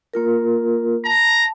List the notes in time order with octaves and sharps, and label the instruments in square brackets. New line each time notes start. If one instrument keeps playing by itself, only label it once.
[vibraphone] A#3 F4 A#4
[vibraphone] A5 [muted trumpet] A#5